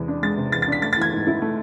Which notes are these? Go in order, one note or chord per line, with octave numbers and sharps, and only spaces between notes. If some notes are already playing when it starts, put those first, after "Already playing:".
Already playing: E2 C3 G#3
D4
G#3 A6
C3
E2 A6
A6
D4 B6
A3 A6
A6
E3 G#6
G#2
E4
A3